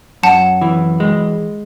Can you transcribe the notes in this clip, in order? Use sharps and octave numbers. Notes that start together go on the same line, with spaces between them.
F#2 F#5 A5
E3
G#3